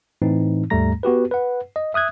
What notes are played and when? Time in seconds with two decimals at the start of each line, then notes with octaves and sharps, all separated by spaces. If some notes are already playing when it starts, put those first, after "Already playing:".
0.22 A2 E3 C4 D#4
0.70 D#2 G#2 G3 A3 A#5 A#6
1.03 B3 F#4 G4 B4
1.31 B4 F#5
1.76 D#5
1.94 E5 D#6 F#6 G#6